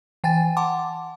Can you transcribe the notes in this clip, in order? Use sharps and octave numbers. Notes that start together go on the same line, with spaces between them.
E3 G5 G#5 A6
F#5 A5 C6 D6